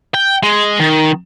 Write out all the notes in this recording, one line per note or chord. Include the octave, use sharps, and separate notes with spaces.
G5
G#3
D#3